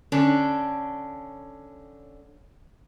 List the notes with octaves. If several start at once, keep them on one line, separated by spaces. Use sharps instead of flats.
D3 C#4 D4